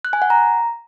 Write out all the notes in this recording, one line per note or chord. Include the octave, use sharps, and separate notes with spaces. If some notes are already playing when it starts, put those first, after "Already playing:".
F#6
G#5
F#5
A#5